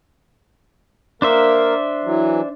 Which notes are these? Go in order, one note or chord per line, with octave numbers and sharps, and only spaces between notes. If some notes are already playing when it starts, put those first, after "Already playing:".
A#3 D4 A#4 C5 E5
E3 F#3